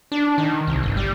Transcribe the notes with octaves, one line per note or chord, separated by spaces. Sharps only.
D4
D#3
C2
G1
G3